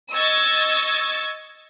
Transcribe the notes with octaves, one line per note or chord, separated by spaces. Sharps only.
D#5 C#6 E6 G#6 A6